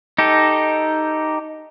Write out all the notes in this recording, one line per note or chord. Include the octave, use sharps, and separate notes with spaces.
D#4 G4 A4